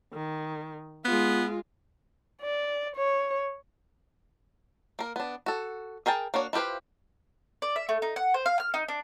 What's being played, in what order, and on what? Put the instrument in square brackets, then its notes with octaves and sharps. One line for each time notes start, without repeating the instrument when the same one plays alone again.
[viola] D#3
[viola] G#3 F4 [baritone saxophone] B3
[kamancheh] D5
C#5
[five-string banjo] A#3 A#4
B3 D4
F#4 A4
G#4 A#4 G5 A5
A#3 D4 F#4 C#5
E4 F4 G4 B4 C5
[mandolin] D5
E5
A3
D#4
F#5
C5
F5
F6
D#4
D4